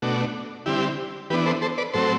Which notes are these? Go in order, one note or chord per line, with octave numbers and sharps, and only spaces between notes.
B2 A3 D4 F#4
D3 G3 C4 E4 G4
E3 B3 D4 G4 B4
A4 C5
A4 C5
B4 D5
A2 F#3 C4 A4 C5